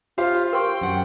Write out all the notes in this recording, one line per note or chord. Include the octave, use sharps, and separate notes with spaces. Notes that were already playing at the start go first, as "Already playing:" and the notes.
F4 G4 C5 F5
A#4 G5 C6 C#6
F#2 F#5